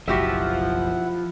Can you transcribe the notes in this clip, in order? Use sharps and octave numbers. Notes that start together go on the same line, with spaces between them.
F#1 B1 F3 E4 F#4 G4 E5 F#5